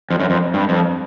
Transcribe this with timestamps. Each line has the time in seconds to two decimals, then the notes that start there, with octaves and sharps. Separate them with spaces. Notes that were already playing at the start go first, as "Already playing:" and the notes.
0.10 F2
0.20 F#2
0.30 F2
0.54 G2
0.69 F2